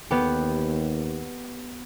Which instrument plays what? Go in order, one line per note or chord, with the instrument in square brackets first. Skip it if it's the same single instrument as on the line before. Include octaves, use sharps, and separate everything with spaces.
[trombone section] D#2 [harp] B3 G4